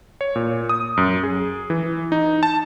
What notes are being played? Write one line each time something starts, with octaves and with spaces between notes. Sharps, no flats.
C#5
A#2
D#6
F#2
G#4
E3
D#4
A5